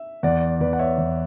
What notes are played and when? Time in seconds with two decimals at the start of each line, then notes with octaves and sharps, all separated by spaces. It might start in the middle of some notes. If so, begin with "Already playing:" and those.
Already playing: E5
0.23 E2 D5 F#5
0.60 E2 B4 D5
0.73 F#5
0.79 C#5 E5
0.98 E2